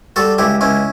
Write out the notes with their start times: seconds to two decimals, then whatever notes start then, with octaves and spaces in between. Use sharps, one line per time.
0.16 G3 F#4 A4
0.38 C#2 E4 G4
0.61 C#2 C#4 E4